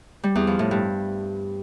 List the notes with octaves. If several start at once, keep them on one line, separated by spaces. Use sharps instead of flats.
G3
E2
F3
A2
G2